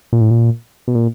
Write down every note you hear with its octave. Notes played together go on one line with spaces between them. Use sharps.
A#2
A2
A#2
B2
A#2